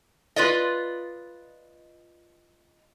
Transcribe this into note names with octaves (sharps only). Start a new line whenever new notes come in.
F4 B4 D5 D#5